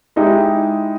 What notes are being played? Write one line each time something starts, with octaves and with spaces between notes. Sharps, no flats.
G#3 D#4 E4 G4